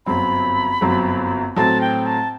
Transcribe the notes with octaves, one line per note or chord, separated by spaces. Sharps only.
G1 F#2 F#3 C4 B5
G1 F#2 F#3 C4
A2 F#3 A3 C4 A5
G5
A5